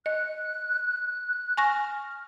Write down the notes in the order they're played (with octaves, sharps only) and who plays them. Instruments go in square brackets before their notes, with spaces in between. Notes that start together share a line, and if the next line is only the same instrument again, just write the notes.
[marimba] D#5 [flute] F#6
[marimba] G#5 C#6 A#6 [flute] F6